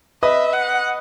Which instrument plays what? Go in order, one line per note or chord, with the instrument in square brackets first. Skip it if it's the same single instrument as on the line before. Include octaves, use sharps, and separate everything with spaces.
[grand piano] B4 D#5 [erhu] E5
[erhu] F#5